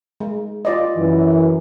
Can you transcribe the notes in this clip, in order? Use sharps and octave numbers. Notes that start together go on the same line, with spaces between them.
G#3
F4 D5 D#5
F#2 E3